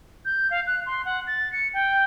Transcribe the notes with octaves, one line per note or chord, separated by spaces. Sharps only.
G6
F5
F#6
C6
F#5
A6
C#7
G5